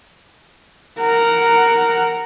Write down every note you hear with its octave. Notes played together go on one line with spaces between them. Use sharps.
A#4 F#5